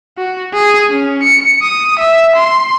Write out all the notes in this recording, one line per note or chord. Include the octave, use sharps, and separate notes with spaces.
F#4
G#4
C#4
C#7
D#6
E5
C6